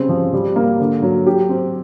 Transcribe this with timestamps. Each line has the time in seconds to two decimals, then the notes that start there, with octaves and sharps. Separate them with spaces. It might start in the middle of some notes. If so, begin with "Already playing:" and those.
Already playing: C#3 G3 C4
0.09 F3
0.33 G3
0.56 A#3
0.80 D3
1.02 F#3
1.27 G4
1.49 C4